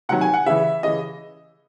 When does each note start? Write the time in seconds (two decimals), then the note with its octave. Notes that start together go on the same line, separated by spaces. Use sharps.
0.09 C3 D#3 F#3 F#5
0.21 G#5
0.34 F#5
0.46 C#3 E3 E5
0.83 C#3 E3 D#5